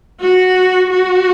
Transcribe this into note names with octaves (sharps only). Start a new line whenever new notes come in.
F#4
F#4